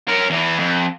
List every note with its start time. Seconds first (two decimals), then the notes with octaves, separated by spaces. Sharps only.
0.08 C#4 A#4
0.30 E2 E3
0.59 F2